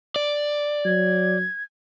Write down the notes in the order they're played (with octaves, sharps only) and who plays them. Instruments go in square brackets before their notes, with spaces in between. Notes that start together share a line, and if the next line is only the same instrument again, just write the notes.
[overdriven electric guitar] D5
[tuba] F#3 [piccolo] G#6